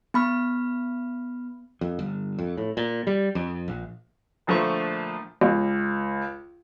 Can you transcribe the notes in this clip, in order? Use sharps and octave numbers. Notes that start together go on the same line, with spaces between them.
B3 B5 F6
F2
G1
F2
A2
A#2
G3
F2
A#1
A#1 D3 F3 A3 C5 C#6
C#2